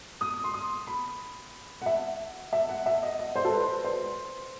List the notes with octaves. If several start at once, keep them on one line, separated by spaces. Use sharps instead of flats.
D#6
C6
D#6
B5
F#5
E5
E5
F#5
E5
D#5
D#5
C5
A4
B4
C5